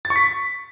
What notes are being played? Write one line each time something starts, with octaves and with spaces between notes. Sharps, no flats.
A6
C#6
B6